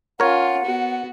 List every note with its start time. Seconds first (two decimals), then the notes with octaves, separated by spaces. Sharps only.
0.20 C#4 F4 A#4 C#5 F#5
0.64 B3 F#4